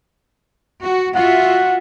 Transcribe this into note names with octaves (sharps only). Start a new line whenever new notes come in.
F#4
F4 F#4 E5 F#5